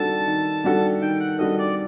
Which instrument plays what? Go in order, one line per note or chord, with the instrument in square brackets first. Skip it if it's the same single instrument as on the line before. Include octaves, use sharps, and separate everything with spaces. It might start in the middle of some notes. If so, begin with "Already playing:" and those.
Already playing: [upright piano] D#3 G3 D4 F#4 A4 [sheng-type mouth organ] A5
[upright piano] D#3
G3 D4 F#4 A4
[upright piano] D#3 [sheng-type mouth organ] G5
[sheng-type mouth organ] F#5
[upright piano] G3 D4 F#4 A4 [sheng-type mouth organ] D#5
[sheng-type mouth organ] D5